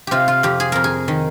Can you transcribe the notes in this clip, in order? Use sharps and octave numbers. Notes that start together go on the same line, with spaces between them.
C3 F4 G4
F4
F2 G4
G#4
F2 A#4
G#4
D#3